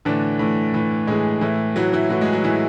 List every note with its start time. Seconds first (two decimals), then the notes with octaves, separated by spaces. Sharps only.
0.05 A2 D3 E3 D4
0.39 A2 E3
0.74 A2 E3
1.07 A2 E3 G#3 G#4
1.41 A2 E3 E4
1.76 A2 E3 F#3 F#4
1.93 E3 E4
2.09 A2 E3 F#3 F#4
2.21 G#3 G#4
2.32 F#3 F#4
2.44 A2 E3 E4